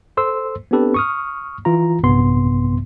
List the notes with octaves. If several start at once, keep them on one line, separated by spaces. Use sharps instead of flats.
A4 C5 C6 E6
B3 C4 D4 G4 A4 B4
C#6 D#6 F6
E3 F4 A#5
A#1 G2 C3 B3 C6